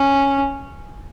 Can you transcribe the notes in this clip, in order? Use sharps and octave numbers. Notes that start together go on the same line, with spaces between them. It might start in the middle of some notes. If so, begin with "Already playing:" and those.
Already playing: C#4